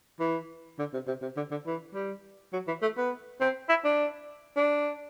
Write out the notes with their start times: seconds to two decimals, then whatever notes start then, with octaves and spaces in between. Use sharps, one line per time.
0.20 E3
0.79 D3
0.94 C3
1.07 C3
1.22 C3
1.37 D3
1.51 D3
1.66 E3
1.94 G3
2.53 F#3
2.67 E3
2.82 A3
2.97 B3
3.40 C4
3.69 E4
3.84 D4
4.56 D4